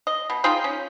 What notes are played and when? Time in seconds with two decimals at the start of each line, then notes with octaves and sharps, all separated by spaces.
0.07 D#5
0.30 B2
0.44 D#4 F4 G#4 G5
0.64 C#4